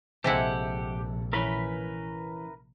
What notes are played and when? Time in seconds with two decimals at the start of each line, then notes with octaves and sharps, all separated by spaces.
0.24 A#1 C3 G#3 E4 G4 A4 F#5
1.33 E3 C#4 A#4 B4 B5